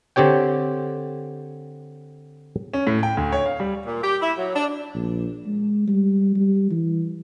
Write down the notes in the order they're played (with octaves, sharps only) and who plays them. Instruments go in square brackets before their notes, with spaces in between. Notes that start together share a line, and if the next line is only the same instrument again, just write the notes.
[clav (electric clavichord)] D3 C4 G4 C#5 G5
[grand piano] C#4
A2
G5
D2
C#5
F5
G3
[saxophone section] A#2
G4
E4
F#3
D4
[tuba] A#1
G#3
G3
G3
E3